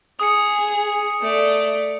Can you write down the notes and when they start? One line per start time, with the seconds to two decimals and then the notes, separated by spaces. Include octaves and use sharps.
0.20 G#4 D#6 C#7
1.22 A3 D5